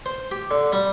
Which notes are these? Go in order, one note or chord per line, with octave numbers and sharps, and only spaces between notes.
C5
G4
D3
G3